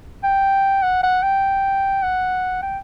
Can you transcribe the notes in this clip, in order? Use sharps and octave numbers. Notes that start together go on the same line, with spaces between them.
G5
F#5
F#5
G5
F#5
G5